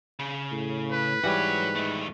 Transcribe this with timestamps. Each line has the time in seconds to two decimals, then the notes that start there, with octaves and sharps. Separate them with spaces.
0.19 C#3
0.52 A2
0.92 B4
1.24 G#2 E3 G3 F#4 C#5
1.76 D#3 A3